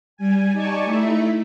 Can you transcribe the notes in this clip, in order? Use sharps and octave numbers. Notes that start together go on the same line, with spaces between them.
G3 G#5
D#4 G4 D5 G#5 A5 C#6
A3 D#4 E4 E5